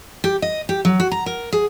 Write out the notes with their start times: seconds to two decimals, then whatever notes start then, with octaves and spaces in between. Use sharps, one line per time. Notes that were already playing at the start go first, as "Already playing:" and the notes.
0.24 G4
0.42 D#5
0.69 G4
0.85 F#3
1.00 F#4
1.12 A#5
1.26 A#4
1.53 G#4